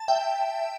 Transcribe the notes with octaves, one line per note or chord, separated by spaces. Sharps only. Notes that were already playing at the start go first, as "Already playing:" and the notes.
Already playing: A5
E5 G5